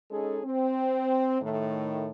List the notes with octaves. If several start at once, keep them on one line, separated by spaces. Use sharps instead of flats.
G#3 C#4 D#4 G#4 A4
C4
A2 D#3 A3